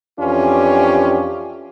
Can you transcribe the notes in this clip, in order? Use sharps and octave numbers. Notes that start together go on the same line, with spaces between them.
F2 E3 C#4 D4 F4 G4